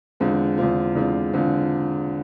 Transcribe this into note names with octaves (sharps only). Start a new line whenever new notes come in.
E2 D3 G#3 C4 F4
E2 D3 G#3 C4 F4
E2 D3 G#3 C4 F4
E2 D3 G#3 C4 F4